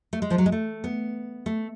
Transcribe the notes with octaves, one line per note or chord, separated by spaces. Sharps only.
A3
G#3
F3
F#3
G#3
A3
B3
A3